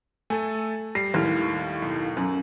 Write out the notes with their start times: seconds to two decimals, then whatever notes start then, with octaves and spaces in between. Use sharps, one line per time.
0.30 A3 A4 G#5
0.95 G3 C7
1.14 D#2 A2 F6
1.82 B1
2.17 F#2